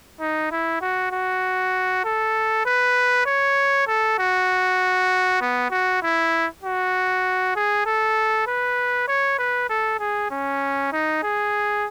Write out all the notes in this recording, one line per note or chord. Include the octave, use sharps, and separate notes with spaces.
D#4
E4
F#4
F#4
A4
B4
C#5
A4
F#4
B3
F#4
E4
F#4
G#4
A4
B4
C#5
B4
A4
G#4
C#4
D#4
G#4